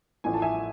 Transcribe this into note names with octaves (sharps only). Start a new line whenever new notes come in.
A1 A2 F3 G#5
A5
E5 G#5